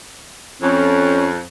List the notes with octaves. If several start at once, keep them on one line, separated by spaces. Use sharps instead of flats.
F2 C#4